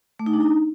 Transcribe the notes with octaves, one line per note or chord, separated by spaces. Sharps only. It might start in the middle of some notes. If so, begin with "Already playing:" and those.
A3
D#4
D4
D#4